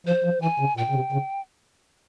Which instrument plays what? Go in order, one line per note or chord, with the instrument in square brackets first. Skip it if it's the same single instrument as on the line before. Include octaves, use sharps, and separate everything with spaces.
[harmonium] F3 [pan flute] C5
[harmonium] F3
[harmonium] E3 [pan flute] G#5
[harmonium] C#3
[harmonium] A#2 [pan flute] G5
[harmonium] C#3
C3
C#3